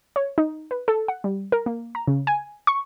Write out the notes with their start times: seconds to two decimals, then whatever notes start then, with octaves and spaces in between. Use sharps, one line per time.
0.16 C#5
0.38 D#4
0.71 B4
0.88 A4
1.08 F#5
1.24 G3
1.52 A#4
1.66 A#3
1.95 A#5
2.07 C#3
2.27 G#5
2.67 C#6